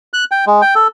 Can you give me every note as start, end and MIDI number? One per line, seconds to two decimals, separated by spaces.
0.14 0.24 90
0.31 0.45 79
0.47 0.62 56
0.62 0.74 79
0.75 0.87 69